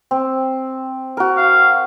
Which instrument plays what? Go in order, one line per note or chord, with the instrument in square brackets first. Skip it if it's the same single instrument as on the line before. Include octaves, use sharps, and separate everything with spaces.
[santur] C4
F#4 A#4
[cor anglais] F5